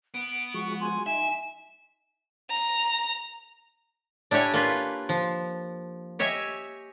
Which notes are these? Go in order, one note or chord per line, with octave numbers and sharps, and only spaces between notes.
B3 D7
F3 G#3 F#4 C#6
G#5 C6
D#4 E5 G#5 E7
A#5
D4 E4 G4 C#5 G#5
A#3 F4 B4
F3
G4 C#5 D#5 E5 G#5